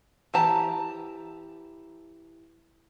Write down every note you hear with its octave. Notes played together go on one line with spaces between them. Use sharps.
E3 G4 A5 A#5